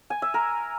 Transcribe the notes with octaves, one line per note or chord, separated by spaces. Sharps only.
G#5
E5
A#4